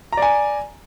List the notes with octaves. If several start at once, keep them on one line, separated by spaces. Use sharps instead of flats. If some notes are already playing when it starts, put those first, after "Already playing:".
D5 G#5 A#5